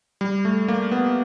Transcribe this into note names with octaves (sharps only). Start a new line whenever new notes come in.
G3
A3
A#3
B3